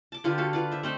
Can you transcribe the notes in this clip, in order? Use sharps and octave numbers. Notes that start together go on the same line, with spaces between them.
A5 D6
D3 F4 G4 B4
F#4 A4 F5
F4 B4 D5
C5 E5
A3 C4 D#4